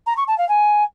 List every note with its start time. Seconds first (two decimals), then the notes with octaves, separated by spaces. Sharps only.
0.07 A#5
0.17 C#6
0.28 A5
0.38 F5
0.49 G#5